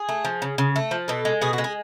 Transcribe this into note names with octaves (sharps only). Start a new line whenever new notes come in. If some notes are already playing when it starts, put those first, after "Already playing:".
Already playing: G#4
A3
F3
C#3
C#3
A3
F3
B2 A4
G#3
B2 G#4
F#4
G#3
G#4